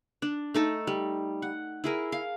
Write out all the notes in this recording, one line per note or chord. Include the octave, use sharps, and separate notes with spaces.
D4
A3 D#4 A4
G3
F#5
E4 G#4 A#4
F5